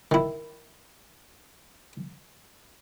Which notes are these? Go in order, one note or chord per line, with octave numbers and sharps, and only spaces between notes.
D#3 E4